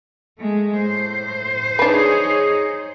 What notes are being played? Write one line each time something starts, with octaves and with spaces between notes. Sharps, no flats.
G#3 A3
A2 C5
D4 D#4 G#4 B4 C#5